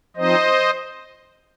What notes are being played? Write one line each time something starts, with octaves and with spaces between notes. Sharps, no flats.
F3 C4 D#4 C5 D#5